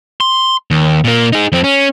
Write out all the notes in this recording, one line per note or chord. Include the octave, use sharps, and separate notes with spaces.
C6
D#2
A#2 A#3
D#4 G#4
F2 C4
C#4